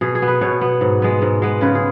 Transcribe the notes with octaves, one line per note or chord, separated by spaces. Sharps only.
B2 G#4
G#4
B3
B4
B2 C#5
B3
G#2
G#3 B3
G#2
G#3 B3
C#3 B4
G#4